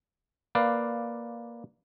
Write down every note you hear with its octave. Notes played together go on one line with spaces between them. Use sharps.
A#3 B4 D5 F5